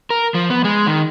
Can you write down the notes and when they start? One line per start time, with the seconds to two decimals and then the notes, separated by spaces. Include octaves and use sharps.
0.10 A#4
0.34 F3
0.50 B3
0.64 G#3
0.87 D#3